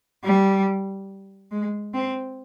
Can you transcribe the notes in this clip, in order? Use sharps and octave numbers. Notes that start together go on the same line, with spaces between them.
G3
G#3
C4